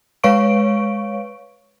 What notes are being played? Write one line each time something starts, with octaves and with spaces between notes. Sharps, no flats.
G#3 B4 C#5 F5 C#6 D7